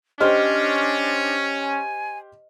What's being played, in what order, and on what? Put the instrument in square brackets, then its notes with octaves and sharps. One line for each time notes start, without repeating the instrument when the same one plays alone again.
[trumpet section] C#4 [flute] D4 [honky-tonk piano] G4 C5 F6 [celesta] D#5
[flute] G#5